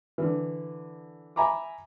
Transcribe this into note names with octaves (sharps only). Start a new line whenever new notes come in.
D3 E3
E5 G#5 A#5 B5 D6